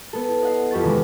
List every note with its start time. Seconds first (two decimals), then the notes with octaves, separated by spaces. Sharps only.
0.13 B3 A4
0.29 E4
0.43 D#5 F#5 C7
0.71 F2 G4 B4 C#6 A6
0.83 D#2 C3 E3 G#3